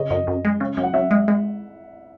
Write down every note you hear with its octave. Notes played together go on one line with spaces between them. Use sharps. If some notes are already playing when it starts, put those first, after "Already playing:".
Already playing: C#3 D#5
F#2 D#5
F#2
G#3
C#3
F#2
F#5
F#2 E5
G#3
G#3